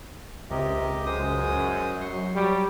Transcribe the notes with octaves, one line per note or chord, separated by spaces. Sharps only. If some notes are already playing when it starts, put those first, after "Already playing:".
C#2 C3 G4 A#4 D#5
F#2 G#3 C5 D#6
F#3 C6 C#6
G3 C#5